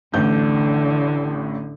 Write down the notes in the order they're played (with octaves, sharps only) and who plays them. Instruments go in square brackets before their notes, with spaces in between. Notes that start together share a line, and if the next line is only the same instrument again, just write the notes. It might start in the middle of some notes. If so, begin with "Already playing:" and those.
[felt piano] A1 A2 G6 [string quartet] D3